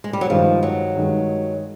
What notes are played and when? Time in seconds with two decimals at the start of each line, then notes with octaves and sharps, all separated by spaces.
0.04 G#3
0.13 G3
0.21 F#3
0.29 G2 D#3 F3 G#3
0.63 F#3
0.95 G2 D#3 G#3